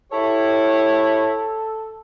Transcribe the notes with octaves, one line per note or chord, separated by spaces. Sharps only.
E4 G4 A4 C#5